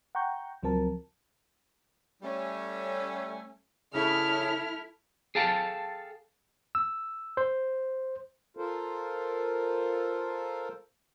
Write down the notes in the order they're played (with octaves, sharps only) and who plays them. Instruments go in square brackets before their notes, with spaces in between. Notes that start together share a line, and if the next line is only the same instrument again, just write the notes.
[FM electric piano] F#5 G5 A#5 C#6 G6
C#2 F3 F#3 C4 A#4 A5
[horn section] G3 A3 C#4
[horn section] C#3 [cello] E4 [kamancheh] A4 F6
[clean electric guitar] G#4 A4 F5 G5 A5
[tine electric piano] E6
C5
[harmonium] F4 A4 A#4 C5